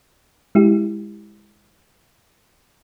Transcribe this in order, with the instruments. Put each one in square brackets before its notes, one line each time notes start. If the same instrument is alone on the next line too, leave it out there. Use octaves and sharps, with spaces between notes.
[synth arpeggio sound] G#3 E4 G4